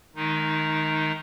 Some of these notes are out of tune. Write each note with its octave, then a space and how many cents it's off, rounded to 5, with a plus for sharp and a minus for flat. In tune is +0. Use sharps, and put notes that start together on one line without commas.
D#3 +0 G#3 +30 D#4 +0